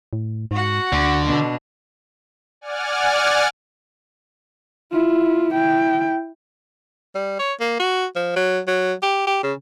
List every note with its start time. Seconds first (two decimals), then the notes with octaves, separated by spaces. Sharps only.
0.13 A2
0.51 G#2 F#4 F#5
0.92 D2 D3
1.25 B2 D4
2.61 D5 F#5 G#5 F6
4.92 E4 F4
5.54 E4 G5
7.15 G3
7.39 C#5
7.60 A#3
7.80 F#4
8.16 F3
8.36 F#3
8.67 F#3
9.02 G4
9.27 G4
9.43 C#3